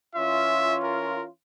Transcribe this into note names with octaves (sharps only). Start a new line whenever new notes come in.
E3 C#4 F4 E5
A#4